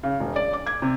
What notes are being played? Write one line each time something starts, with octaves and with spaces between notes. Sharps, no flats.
C#3
E1
D5
D6
G#6
C3